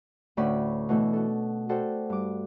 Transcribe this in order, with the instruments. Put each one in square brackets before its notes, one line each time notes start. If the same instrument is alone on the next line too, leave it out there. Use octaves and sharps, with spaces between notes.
[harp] D2 A2 C#4 D5 B5
B2 E3 A3
F#4 A4
F#4 A4 C5 D5 G5
G2 D6